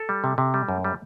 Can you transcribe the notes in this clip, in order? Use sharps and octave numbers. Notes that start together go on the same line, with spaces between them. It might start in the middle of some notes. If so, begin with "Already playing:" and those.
Already playing: A4
G3
C3
C3
G3
F#2
G3